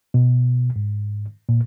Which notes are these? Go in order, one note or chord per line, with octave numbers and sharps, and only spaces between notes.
B2
G#2
A#2